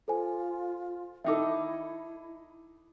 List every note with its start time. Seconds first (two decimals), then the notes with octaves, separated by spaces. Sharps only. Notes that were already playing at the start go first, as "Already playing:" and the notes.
0.08 F4 A4 C5 G#5
1.24 D#3 D#4 E4 A4 E5 D6